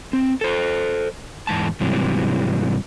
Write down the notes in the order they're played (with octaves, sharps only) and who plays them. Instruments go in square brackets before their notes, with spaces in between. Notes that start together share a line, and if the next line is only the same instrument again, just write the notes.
[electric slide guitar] C4
A4 C5
E2 G#2 A5
G#2 C3 E3 F#3 G3